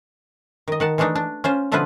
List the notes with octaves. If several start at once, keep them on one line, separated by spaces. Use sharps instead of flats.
D#3 D#5
D#3 F#5 A5
E3 G#3 A3 D4 D#4
D4
C#4 F4 C5
B2 D3 F3 E4 F4 B4